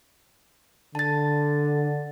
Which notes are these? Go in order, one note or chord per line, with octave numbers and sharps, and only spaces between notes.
D3 A5 A6